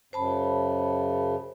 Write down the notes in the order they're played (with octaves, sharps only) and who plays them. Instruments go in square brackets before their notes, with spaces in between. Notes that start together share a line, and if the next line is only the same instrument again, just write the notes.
[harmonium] F#2 C#3 [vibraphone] C5 A5 B5